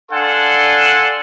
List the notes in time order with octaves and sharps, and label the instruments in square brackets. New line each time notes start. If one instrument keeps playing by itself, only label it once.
[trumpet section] D4 A4 F5 F#5 G#5 C6